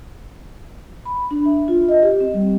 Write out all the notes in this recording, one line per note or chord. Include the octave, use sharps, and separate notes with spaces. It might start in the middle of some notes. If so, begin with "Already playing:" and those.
B5
D4
E5
F4
D#5
G4
C4
G3